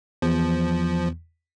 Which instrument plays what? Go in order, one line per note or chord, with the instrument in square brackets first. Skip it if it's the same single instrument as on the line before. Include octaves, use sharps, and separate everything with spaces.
[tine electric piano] E2 [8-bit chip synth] F3